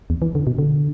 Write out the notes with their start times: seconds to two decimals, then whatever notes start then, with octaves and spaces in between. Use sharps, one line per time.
0.10 E2
0.22 E3
0.35 D3
0.47 B2
0.59 D3